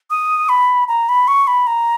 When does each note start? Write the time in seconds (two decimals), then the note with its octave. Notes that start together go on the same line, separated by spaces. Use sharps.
0.10 D#6
0.49 B5
0.88 A#5
1.09 B5
1.28 C#6
1.47 B5
1.67 A#5